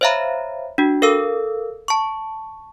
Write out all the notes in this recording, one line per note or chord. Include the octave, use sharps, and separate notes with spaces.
C5 C#5 E5 F5 A#5 B5
D4 F#4
A4 A#4 F5 E6
A5 C#6